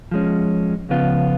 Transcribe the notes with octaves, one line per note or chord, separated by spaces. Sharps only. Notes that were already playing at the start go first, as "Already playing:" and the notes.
F3 G#3 C#4
C#2 C#3 F3 B3 F4